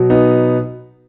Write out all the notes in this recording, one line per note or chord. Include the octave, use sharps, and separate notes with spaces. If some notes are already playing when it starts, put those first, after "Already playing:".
Already playing: B2 F#3
B3 D#4